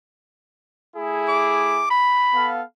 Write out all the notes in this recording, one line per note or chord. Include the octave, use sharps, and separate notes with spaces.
A3 E4 G#4
D6
B5
B3 A4 F5